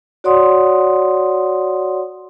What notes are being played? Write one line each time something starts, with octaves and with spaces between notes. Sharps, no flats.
F#4 C#5 D5 F#5 C6 D#6